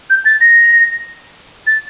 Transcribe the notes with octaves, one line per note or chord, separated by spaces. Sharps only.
G6
A6
A#6
A6